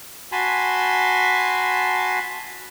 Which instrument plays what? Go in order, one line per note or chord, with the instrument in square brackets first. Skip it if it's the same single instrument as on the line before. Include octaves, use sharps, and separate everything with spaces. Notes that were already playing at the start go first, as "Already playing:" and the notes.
[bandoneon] F#4 G#5 A5 B5 C6